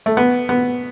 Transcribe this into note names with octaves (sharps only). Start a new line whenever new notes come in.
A3
B3
B3